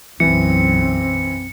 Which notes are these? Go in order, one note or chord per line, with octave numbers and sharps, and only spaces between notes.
B1 F#2 E3 C4 C#7